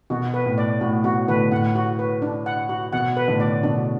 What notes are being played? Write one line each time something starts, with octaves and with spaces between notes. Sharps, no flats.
B2 F#4
B4
A2
D5
A2 F#4
B2 F#4
A2 D3 B4
A2 F#5
F#4
B4
D4
F#5
F#4
B2 F#5
B4
A2 D3
D5
B2 D4